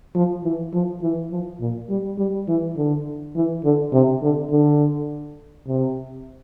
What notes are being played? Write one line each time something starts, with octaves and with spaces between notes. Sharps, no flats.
F3
E3
F3
E3
F3
A#2
G3
G3
E3
D3
E3
D3
C3
D3
D3
C3